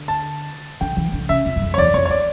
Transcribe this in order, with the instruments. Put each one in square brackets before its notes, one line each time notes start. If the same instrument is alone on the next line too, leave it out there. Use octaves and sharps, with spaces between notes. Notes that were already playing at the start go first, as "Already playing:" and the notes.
Already playing: [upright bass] D3
[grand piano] A5
[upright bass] D3 [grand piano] G5
[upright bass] E3
D3
[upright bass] C#3 [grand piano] E5
[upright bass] F2
G2
F2
[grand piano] C#5
[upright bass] E2 [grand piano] D5
[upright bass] F2 [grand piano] C#5
[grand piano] C#5
[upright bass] E3 [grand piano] D5